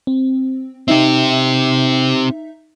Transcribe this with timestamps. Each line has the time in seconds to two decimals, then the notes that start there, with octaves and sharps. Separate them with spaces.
0.07 C4
0.88 C4 D#4 G4 E5